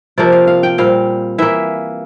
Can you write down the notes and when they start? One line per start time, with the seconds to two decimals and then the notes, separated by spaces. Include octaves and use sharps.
0.18 C3 F3 A#3 D5
0.32 F5
0.47 F5
0.63 G5
0.78 A#2 G3 C4 F5
1.38 E3 A#3 E5